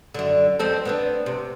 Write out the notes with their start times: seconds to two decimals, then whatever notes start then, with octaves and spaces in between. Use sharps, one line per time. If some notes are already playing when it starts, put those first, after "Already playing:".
0.14 F#2 D3
0.59 F2 C4 A4
0.85 B3 C4 D4
1.26 C3